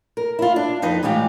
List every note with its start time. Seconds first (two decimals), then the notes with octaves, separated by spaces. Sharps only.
0.17 A#4
0.39 E4 F4
0.56 D4
0.82 F2 D#4 B4 D#5
1.03 A2 E3 G#3 F4 G4